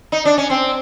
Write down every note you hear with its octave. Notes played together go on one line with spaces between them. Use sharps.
D#4
D4
C#4
C4